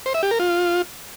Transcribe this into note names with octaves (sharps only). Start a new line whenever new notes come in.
C5
E5
G4
A#4
F4